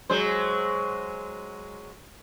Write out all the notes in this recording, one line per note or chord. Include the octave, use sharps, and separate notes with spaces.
F#3 G#3 C5